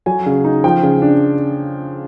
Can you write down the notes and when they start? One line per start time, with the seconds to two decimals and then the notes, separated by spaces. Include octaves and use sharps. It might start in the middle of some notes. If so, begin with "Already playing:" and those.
0.06 F#3 G#5
0.26 C#3
0.44 D#4
0.64 F3 G5
0.83 C#3
1.02 D4